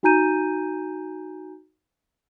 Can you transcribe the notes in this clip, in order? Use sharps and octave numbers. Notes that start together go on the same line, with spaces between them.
D#4 F#4 G#5 A#5 G6 D#7